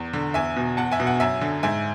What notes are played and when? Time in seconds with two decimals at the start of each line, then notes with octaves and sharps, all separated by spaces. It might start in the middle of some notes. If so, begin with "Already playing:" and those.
Already playing: E2
0.13 D3
0.34 E2 E5 G#5
0.56 B2
0.77 E2 F#5 A5
0.92 E5 G#5
1.00 B2
1.07 F#5
1.20 F#2 E5 G#5
1.41 D3
1.63 G#2 E5 G#5